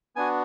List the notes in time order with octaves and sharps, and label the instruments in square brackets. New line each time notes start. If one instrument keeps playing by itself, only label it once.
[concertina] B3 D4 F#4 G#5